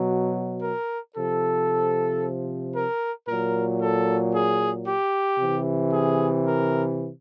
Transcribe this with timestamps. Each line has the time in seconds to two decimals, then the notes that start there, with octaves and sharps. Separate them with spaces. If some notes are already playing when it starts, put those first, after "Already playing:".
Already playing: B2 F#3
0.62 A#4
1.15 C3 F3 A4
2.74 A#4
3.27 A#2 F#3 A#4
3.81 A4
4.34 G#4
4.86 G4
5.39 C3 E3
5.92 G#4
6.45 A#4